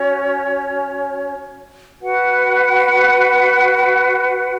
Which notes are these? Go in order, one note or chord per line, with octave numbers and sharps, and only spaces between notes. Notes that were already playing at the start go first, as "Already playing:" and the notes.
Already playing: C#4 F#4 C#5
F#4 B4 F#5